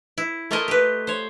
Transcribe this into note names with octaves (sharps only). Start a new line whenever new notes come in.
E4
A3 A#3 F4 A4 A#4 D#5
G4 B4
C5 C#5